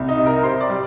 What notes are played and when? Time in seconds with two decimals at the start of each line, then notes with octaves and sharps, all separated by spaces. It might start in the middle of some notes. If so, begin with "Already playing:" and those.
Already playing: C2
0.08 D#4 D#5
0.18 C3
0.26 A#4 A#5
0.43 C3 C5 C6
0.60 D5 D6
0.70 G3